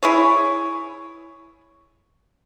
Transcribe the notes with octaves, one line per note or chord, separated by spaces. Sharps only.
E4 G#4 C#5